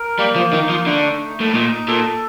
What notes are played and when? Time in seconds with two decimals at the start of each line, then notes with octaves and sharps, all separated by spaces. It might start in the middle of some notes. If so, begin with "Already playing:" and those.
Already playing: A#4
0.18 G3 A#3
0.36 F3
0.52 D#3 D#4
0.69 F3
0.86 D3 A3
1.20 D#4
1.40 A2
1.54 A#2 D#4
1.88 A#2 A4